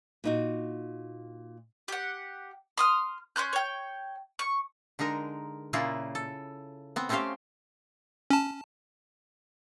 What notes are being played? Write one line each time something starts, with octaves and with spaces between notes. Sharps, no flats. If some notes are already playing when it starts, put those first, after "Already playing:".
A#2 D#4 F#4
G4 F#5
C6 D#6 F6
C#4 C6 F#6 G6
C#5 G5
C#6
D3 G#3 D#4 A#4
A#2 C#3 A#3 E4 F4 G#4
A4
B3 C4
A3 C4 C#4 G4 C5 F5
C#4 A5